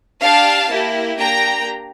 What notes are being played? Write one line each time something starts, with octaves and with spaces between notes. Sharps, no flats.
D4 G4 F5 A5
A#3 E4 G4
A#3 D4 G4 G5 A#5